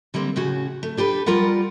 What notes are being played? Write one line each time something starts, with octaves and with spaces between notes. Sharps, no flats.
D3 G3 A#3 C4
A2 C#3 C#4 F#4
A3
D4 G4 A4 B4
G3 F4 A#4 D5 F#5